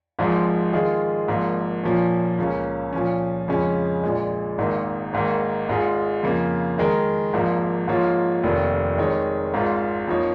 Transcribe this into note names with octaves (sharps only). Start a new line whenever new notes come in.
G#1 G#2 F3 G#3
D#3 G#3 F4 G#4
G#1 G#2 F3 A#3
A#2 F3 A#3 C#4
C#2 C#3 A#3 C#4
A#2 F3 C#4
F2 C#3 G#3 C#4
A#1 A#2 G#3
G#1 G#2 D#3 A#3 D#4
G#1 G#2 D#3 A#3
G#1 G#2 G#3 F4 G#4
F2 C#3 A#3 F4
D#3 G#3 D#4 A#4
G#1 G#2 F3 A#3
G#2 F3 A#3 F4 C#5
F1 D#2 D#3
D#3 G#3 D#4 C#5
G#1 G#2 G#3 F4
F2 F3 A#3 D#4 C#5